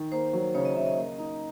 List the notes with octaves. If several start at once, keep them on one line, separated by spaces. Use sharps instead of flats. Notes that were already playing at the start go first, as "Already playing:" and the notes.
Already playing: D#3
A#3 C5
F#3
C#3 C#5
D#5
C#3 E5
D#5
A#3
D#4